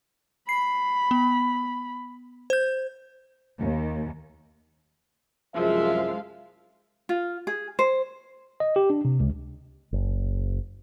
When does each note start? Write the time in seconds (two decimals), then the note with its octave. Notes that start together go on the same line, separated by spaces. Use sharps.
0.49 B5 C7
1.11 B3
2.50 C5 G6
3.59 D#2
5.55 C2 F#2 F3 G#3 E5 F5
7.09 F4
7.47 G#4
7.79 C5
8.60 D#5
8.76 G4
8.90 D4
9.05 C3
9.20 C#2
9.92 F#1